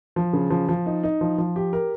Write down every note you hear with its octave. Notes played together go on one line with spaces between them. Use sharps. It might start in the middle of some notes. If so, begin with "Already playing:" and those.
F3
C#3
F3
F3
D#4
D#4
F3
F3
G4
A#4